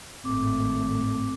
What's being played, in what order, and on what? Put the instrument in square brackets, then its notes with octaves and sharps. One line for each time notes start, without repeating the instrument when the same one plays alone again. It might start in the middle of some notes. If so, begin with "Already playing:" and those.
[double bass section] G#1 A2 A3 [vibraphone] C4 D6